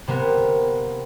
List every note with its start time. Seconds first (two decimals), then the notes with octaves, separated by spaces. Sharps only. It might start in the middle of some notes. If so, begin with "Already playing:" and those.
0.07 C3 A#3 B3